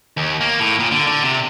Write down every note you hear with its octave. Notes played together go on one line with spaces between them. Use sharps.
D#2
A#3
A2
A#2
D3
D3
C3